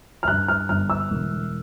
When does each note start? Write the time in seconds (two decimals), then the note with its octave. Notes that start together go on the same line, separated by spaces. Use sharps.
0.23 F6
0.28 G2 F#6
0.48 F6
0.69 G1 F6
0.90 E6
1.10 E1